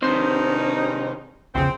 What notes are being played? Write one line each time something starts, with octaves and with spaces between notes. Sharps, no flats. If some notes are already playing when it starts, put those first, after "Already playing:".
G2 C3 D#3 C#4 D#4 C5
A#1 E2 C#3 C4